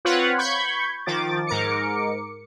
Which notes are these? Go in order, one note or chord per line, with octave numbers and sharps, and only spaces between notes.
C4 F4 B4 C#5 F#5
B5 C#6 G6 G#6
D#3 F3 D6 A6
G#2 A#4 D6 C#7